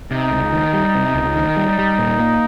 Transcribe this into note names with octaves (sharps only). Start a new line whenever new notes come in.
C3 D#4
C#2
D#3
G3
C3
C#2
D#3
G3
G3
A#2
A#3